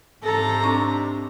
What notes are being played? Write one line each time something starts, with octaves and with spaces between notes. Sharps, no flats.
G#2 C3 A4 A#5
C4 D4 C#6